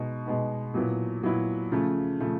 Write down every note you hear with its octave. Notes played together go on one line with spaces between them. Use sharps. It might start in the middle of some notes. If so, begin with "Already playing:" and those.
Already playing: B2 G#3 B3 D#4
B2 G#3 B3 D#4
A#2 F#3 B3 E4
A#2 F#3 B3 E4
C#3 F3 A3
C#3 F3 A3